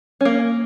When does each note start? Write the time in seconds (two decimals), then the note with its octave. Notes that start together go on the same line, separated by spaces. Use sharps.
0.21 C#4
0.25 A#3